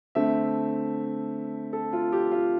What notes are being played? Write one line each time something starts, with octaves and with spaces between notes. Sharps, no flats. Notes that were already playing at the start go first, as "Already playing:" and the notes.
D3 A3 C4 E5
A4
F4
G4
F4